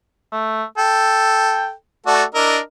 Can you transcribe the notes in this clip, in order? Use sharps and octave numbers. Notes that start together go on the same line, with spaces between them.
A3
A4 G5
A3 F#4 A4 D5
D4 E4 A#4 D#5